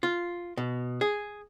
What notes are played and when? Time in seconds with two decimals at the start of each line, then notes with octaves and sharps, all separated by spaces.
0.03 F4
0.57 B2
1.01 G#4